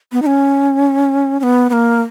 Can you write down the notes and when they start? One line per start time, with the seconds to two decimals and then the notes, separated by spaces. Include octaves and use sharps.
0.12 B3
0.22 D#4
0.26 C#4
1.40 C#4
1.43 B3
1.70 B3
1.73 A#3